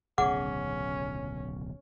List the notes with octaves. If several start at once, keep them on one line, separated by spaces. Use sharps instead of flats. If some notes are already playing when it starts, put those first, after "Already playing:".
D1 B1 C#3 C#4 G#4 F#5 D6